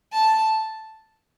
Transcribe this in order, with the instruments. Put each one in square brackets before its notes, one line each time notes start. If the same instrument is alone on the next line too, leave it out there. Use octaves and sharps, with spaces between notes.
[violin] A5